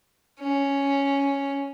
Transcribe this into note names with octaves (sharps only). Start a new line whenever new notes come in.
C#4